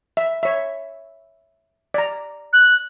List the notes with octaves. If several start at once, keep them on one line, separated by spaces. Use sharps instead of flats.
E5
C#5 E5
D5 A#5
F#6